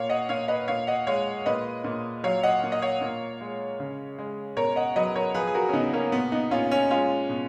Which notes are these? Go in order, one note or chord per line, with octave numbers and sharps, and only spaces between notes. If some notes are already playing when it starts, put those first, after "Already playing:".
Already playing: A#2 C#5 F5
D#5 F#5
A#2 C#5 F5
B4 D#5
A#2 C#5 F5
D#5 F#5
G#3 C#5 F5
A#2 B4 D#5
A#2
F#3 C#5 F5
D#5 F#5
A#2
D#5
C#5 F5
A#2
G#3
C#3
G#3
B2 A#4 C#5
D#5 F#5
F#3 B4 D#5
A#4 C#5
F3 G#4 B4
G#4
F#4 A#4
C#4
C#3 B3 D#4
A#3 C#4
A#2 B3
B3 D#4
A#2 C#4 F4
C#4 F4
G#3 C#4 F4
B2